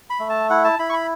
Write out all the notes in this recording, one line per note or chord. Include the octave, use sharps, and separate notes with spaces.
B5
A3
A5
E4 F#5
A5
E4 B5
C#6
B5